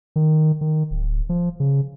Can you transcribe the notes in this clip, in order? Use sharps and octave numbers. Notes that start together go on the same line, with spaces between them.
D#3
D#3
D1
F3
C#3